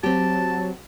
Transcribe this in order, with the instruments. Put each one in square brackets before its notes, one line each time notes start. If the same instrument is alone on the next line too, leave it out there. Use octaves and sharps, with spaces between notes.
[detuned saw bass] F#3 [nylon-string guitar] C4 G4 [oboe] A5